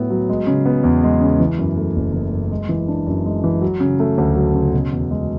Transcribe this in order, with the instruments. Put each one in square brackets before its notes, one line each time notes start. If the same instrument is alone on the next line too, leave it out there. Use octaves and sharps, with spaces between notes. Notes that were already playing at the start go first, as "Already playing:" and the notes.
Already playing: [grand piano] A2 F#3 B3 E4
F#3
G#3
C#3
B3
E2
G#3
C#3
E3
F#2
A3
F#1
E3
F#2
G#3
E3
D4
F#2
G#3
E3
F#3
C#3
A3
D2
F#3
C#3
B2
E2
G#3